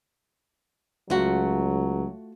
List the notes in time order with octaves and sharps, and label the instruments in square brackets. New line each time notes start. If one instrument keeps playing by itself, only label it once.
[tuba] C#2 [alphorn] F#3 [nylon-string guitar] A3 F4 F#4